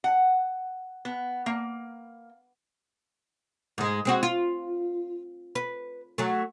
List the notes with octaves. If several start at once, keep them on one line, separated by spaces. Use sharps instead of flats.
F#5
B3
A#3
G#2 G#3
G#3 C4 F#4
F4
B4
F#3 A3